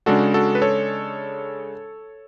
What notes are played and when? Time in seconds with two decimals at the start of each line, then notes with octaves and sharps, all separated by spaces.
0.06 C#3 G#3 D4 F#4 A4
0.34 F#4 A4
0.55 B4
0.62 A4 C#5